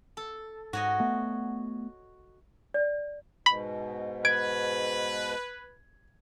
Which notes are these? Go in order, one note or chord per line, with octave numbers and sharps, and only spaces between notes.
A4
G#2 F#4 C#5 D#5
A3 B3
D5
G#2 B2 B5
B4 G#6 D7